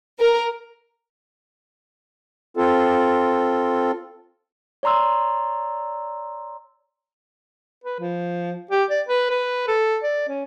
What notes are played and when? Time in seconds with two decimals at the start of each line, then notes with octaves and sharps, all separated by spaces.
0.20 A#4
2.57 C4 F4 A4
4.83 C#5 D5 A#5 C6 E6
7.84 B4
8.00 F3
8.71 G4
8.90 D5
9.09 B4
9.31 B4
9.68 A4
10.03 D5
10.29 C#4